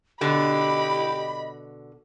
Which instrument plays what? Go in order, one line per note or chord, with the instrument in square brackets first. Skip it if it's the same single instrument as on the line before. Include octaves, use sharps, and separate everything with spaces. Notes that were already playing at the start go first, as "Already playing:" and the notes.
[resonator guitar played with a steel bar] B2 D3 [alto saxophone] G4 [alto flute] D#5 [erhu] B5